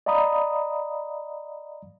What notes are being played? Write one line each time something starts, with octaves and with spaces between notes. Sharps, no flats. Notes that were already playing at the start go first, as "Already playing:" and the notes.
D5 D#5 F5 A#5 B5 D#6